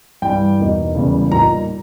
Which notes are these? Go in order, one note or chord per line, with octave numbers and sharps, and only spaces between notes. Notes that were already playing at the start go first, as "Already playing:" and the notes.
G2 E3 G3 G5
E2 B2 A#3 D#4
E1 E2 C#3 G3 A#3
A#2 G3 A#3 D#4 A#5